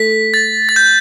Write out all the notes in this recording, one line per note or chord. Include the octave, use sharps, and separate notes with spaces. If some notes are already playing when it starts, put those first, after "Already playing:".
Already playing: A3 B6
A6
A6
G6